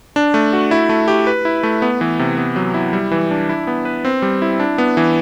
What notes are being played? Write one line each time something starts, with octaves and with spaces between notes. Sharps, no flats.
D4
A3
F#4
E4
A3
G4
B4
E4
A3
B3
E3
C3
B3
F#3
E4
G3
E3
D4
E4
B3
B4
C4
G3
E4
D4
B3
E3